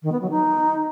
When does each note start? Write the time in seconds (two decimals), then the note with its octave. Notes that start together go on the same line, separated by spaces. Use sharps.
0.02 D#3
0.11 B3
0.21 F#3
0.30 D#4